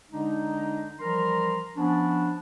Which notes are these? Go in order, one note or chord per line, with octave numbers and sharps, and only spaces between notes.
D3 G#3 D4 D#4
E3 F3 G3 A#4 A#5 C6
F3 B3 C#4 D4